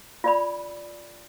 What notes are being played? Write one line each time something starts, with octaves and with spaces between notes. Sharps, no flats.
F4 D5 B5